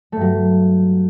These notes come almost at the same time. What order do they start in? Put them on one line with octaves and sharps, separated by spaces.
A3 G2 F#3